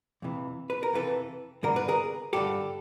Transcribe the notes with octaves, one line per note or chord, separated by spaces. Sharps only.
F2 C3 E3
B4
A#4
F2 C3 E3 A4 B4
G2 D3 A#4
B4
G#4 A#4
G2 D3 G4 A4